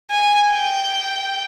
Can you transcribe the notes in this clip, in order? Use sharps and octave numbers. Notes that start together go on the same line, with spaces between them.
G#5
G5